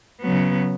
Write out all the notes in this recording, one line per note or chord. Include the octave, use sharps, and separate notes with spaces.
C#3 F#3 B3